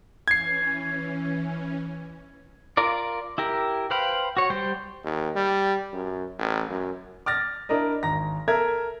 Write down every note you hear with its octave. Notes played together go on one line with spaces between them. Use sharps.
E3 C#4 G#6 C7
F4 A#4 D5
E4 G4 A#4
B4 C5 F5 G5 B5
F#4 C#5
G3 C5 G5
D#2
G3
F#2
A1
F#2
D6 F6 A6 A#6
D4 E4 A#4 D#5
G#1 A#5 A#6
A4 A#4 E5 G#6